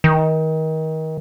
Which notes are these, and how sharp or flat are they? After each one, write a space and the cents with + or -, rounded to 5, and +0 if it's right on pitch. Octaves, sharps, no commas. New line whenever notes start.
D#3 +30